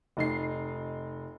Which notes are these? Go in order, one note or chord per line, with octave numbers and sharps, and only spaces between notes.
F1 D#4 C7